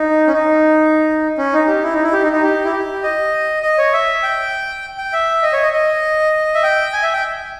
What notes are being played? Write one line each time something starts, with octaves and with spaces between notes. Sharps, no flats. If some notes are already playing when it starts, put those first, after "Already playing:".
Already playing: D#4
C#4
D#4
C#4
D#4
G4
E4
D#4
E4
G4
D#4
D#4
G4
E4
G4
D#5
D#5
C#5
E5
G5
G5
E5
D#5
C#5
D#5
D#5
E5
G5
G#5
E5
G5